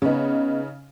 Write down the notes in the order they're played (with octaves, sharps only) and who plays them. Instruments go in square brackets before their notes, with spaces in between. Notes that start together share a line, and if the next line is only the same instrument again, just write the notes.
[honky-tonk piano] C#3 D#4 [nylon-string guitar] B3 C#4